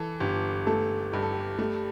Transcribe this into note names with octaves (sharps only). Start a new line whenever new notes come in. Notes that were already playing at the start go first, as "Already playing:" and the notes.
Already playing: E3 A4
G1 G4
A3 A4
G2 G4
A4
G4
A3